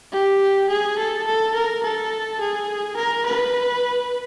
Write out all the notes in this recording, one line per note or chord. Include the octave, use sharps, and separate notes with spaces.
G4
G#4
A4
A4
A#4
A4
G#4
A#4
B4